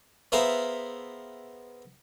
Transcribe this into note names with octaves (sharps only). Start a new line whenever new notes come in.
B3 G#4 A#4 C5 E5 F5